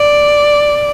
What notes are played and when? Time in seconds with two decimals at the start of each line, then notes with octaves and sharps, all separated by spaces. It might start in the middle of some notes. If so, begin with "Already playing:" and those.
Already playing: D5